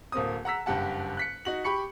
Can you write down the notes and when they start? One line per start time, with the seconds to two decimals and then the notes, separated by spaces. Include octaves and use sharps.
0.12 D1 A#3 C4 D#6
0.45 F#5 A#5 E6 B6
0.66 F#1 G2 G4 F#5 A5
1.17 F#6 B6 C#7
1.45 D#4 F#4 F#7
1.64 G4 B5 C#6 C#7